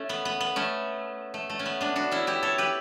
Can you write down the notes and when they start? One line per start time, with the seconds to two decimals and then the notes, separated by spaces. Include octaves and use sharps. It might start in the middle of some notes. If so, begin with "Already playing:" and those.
Already playing: A3 C#4
0.09 B3
0.25 B3
0.40 B3
0.56 A3 C#4
1.34 A3
1.50 A3
1.59 C#4
1.66 B3
1.81 B3 D4
1.96 D4 F#4
2.11 C#4 E4
2.27 E4 G4
2.42 A4 C#5
2.58 G4 B4